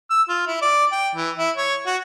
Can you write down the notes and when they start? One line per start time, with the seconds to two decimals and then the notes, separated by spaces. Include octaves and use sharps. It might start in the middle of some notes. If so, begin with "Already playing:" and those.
0.10 E6
0.29 F4
0.47 E4
0.62 D5
0.92 G5
1.15 E3
1.37 E4
1.57 C#5
1.86 F#4